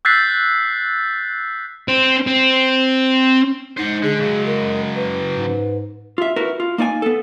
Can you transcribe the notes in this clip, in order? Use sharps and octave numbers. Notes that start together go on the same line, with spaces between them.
E6 F#6 G6 A6 B6 C7
C4
C4
G#3 D#4 C5 F#5
D3 G#4
C#3 F#3
A#4
B4
G#2
F4 E5
E4 F#4 A#4 B4
F4
A#3 D#4 D5 G#5
B3 A4